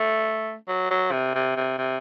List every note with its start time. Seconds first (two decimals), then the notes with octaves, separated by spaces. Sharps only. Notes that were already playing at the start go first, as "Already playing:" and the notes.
Already playing: A3
0.68 F#3
0.90 F#3
1.12 C3
1.35 C3
1.56 C3
1.78 C3